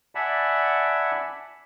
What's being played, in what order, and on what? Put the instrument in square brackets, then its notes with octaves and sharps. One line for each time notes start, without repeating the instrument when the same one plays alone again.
[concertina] D5 E5 F#5 G#5 A5 B5